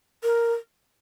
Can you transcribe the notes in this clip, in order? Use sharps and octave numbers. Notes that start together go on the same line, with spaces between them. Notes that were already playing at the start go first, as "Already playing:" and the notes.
A#4